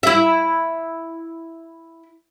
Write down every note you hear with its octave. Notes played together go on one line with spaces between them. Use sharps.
E4 E5